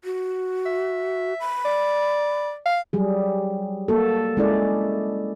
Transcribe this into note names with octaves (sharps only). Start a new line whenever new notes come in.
F#4
E5
B5
D5
F5
F#3 G3 G#4
A#3 F#4 A4
G#3 C#4 E4 A4 D5